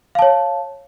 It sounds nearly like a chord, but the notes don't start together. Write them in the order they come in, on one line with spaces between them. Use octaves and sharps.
F5 A5 C#5